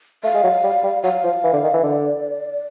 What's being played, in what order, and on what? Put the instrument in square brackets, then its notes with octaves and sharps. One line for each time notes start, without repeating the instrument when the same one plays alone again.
[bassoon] A3 [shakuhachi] F5
[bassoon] G#3
F#3
G3
G3
[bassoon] F#3 [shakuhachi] F5
[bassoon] F3
E3
D3
D#3
E3
[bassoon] D3 [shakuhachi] D5